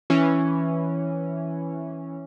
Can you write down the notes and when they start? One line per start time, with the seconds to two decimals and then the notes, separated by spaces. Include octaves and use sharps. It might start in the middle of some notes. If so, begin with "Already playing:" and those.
0.10 E3 C#4